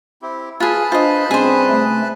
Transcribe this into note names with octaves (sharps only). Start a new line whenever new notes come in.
C4 E4 G4
F4 G#4 B4 A5 B5
D4 F4 C5 D#5
C3 G3 C4 C#4 G#4 C5
A3